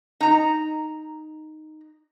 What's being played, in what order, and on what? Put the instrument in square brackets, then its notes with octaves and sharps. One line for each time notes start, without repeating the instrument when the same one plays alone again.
[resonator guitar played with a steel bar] D#4 A#5